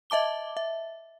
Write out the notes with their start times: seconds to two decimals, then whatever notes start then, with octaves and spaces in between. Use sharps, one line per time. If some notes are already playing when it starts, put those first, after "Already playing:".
0.10 D#5 E5 A5 D6 G7
0.57 E5